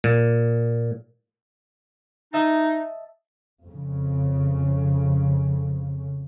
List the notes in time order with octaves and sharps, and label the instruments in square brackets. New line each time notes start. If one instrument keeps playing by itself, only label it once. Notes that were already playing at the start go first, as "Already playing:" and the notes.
[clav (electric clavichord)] A#2
[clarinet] D#4 [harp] D#5 E5 A5
[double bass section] F2 C#3